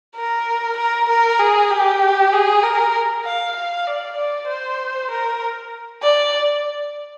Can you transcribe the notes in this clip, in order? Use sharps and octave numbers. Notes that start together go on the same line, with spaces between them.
A#4
A#4
A#4
G#4
G4
G#4
A#4
F5
F5
D5
D5
C5
A#4
D5